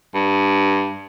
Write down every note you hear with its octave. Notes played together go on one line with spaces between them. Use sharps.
G2